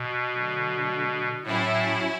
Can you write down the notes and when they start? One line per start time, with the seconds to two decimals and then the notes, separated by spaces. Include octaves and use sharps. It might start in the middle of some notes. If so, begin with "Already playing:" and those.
Already playing: B2
0.33 D3 F#3 A3
1.44 A2 F#3 C#4 E4